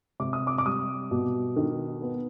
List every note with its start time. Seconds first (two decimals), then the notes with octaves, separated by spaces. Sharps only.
0.20 C3 D6
0.33 D#6
0.47 D6
0.58 D6
0.65 G3 D#6
1.11 B2
1.56 D#3
2.02 B3